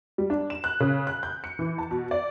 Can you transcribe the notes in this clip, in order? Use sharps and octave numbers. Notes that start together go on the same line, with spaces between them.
G3
D4
E7
F#6
C#3
F#6
G6
C#7
E3
A5
B2
D5